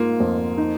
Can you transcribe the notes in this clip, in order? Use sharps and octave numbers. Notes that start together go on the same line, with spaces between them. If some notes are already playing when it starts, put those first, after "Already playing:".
Already playing: G#2 A#3 F4
F2
D#4